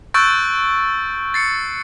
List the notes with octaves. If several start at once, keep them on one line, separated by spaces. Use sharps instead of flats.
C#6 E6 F#6 G6 A6 D7
A6 C7 C#7